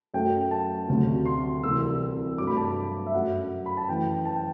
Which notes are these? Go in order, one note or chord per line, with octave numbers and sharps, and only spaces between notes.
F#2 F#3 A3 G5
A5
D2 C3 F#3 A3
C6
C2 C3 E3 E6
G2 F#3 A3 D6
B5
A5
E5
F#2 F#3 A3 F#5
B5
A5
F#2 E3 A3 G5
A5
G5